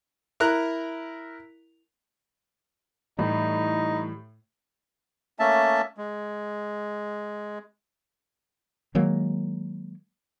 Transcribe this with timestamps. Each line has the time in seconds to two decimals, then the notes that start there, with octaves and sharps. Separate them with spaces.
0.40 E4 A#4 A#5 F#6
3.19 A2 E3 G3 D#4
5.39 A3 A#3 C#4 E5 A5
5.97 G#3
8.95 D#3 F#3 G#3 A#3